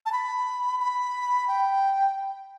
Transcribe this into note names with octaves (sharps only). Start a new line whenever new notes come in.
A5
B5
B5
G5